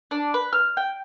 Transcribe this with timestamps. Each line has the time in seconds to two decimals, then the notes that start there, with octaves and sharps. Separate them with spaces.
0.11 D4
0.34 B4
0.53 F6
0.77 G5